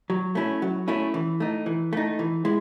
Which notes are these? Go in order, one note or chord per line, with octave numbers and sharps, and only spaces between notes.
F#3
A3 C#4 E4
F#3
A3 C#4 E4
E3
A3 D#4
E3
A3 D#4
E3
G#3 E4